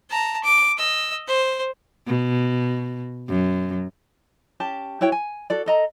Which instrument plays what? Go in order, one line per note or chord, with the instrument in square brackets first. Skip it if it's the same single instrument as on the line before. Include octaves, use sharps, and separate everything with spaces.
[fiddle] A5 A#5
D6
D#5 E6
C5
[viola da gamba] B2
F#2
[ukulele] C#4 G4 A5
E4 F#4 C#5 G5
G#5
F#4 A4 D5
A4 D#5 A#5